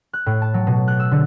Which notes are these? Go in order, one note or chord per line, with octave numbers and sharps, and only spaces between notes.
F#6
A2
A5
F#3
B2
F#6
E6
D3